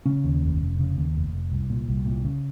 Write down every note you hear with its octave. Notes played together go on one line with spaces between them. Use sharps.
C#3 C#4
D#2
F1
F1
C#3
D#2
F1
F1
C2
A#2
C2
A#2
C#3